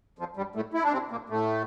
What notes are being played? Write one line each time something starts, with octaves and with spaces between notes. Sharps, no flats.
F2 F3
G2 G3
A2 A3
E4
D4
C3 C4
A#2 A#3
A2 A3